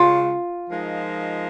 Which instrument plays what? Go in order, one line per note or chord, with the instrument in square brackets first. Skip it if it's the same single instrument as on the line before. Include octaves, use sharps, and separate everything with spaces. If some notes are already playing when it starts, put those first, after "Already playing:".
Already playing: [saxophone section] C#3 G#3 C#4 [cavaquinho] F4
[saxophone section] F3 G#3 D#4 A#4